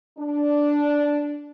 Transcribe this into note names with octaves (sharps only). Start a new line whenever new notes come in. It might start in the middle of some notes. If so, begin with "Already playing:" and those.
D4